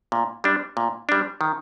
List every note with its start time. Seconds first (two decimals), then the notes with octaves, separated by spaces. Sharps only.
0.12 A#2
0.44 G3 D4
0.77 A#2
1.09 G3 D4
1.41 D#3